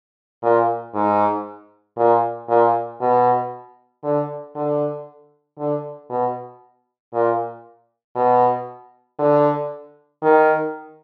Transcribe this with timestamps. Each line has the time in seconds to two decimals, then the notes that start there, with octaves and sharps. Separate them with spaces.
0.43 A#2
0.94 G#2
1.97 A#2
2.49 A#2
3.01 B2
4.04 D3
4.55 D3
5.59 D3
6.10 B2
7.13 A#2
8.16 B2
9.19 D3
10.23 D#3